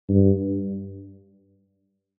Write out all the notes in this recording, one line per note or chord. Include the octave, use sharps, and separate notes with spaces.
G2